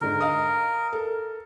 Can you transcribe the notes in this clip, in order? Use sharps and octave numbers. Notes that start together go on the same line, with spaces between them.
G#2 D3 A#4
D#5 F5 D#6
A4 A#4